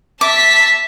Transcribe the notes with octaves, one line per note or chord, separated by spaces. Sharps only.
E5 A5 D6 B6